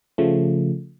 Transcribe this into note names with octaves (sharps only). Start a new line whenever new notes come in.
C#3 F3 A3